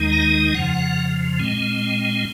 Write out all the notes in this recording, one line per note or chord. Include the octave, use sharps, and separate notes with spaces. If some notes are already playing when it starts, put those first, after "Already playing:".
Already playing: D#2 D#3 G#3 D#4
A#5
F2 C#3 F3 F#5
A#2 G#3 C4